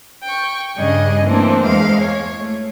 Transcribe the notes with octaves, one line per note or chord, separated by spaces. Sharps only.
G5 C#6
G2 C#3 G3 D4 G#4 D#5
E3 A3 A#3 C4 D4
E2 G#3 F5
C#5
A3